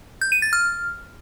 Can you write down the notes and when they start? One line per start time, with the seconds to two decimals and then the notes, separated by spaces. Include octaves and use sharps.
0.21 G6
0.32 D#7
0.42 A6
0.53 F6